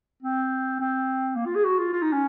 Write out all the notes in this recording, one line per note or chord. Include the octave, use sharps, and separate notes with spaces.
C4
C4
A#3
F4
G#4
F#4
F4
F4
D#4
C#4